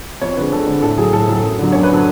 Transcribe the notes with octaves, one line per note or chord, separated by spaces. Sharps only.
F2 C#5
D3 G#3 B4
F2 A4
D3 G#3
A2 A4
F#3 G#4
A2 A4
F#3
F#2
D3 F#3
F#2 C#5
B4
D3 F#3 A4